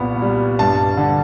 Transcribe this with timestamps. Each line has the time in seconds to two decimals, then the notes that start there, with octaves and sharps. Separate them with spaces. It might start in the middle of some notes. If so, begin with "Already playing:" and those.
Already playing: C2 A#2 B3
0.22 G3
0.59 G2 A5
0.97 D3